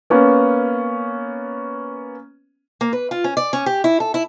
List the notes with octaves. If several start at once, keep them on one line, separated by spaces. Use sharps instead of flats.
A#3 B3 C#4
A#3
B4
F4
C#4
D5
C#4
G4
E4
A4
E4